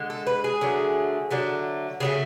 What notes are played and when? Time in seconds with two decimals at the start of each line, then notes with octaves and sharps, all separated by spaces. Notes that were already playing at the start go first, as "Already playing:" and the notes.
Already playing: D3 G#3
0.10 A4
0.27 B4
0.44 G#4
0.61 D3 F#3 A3
1.31 D3 F#3 A3
2.00 C#3 F#3 A3 G#4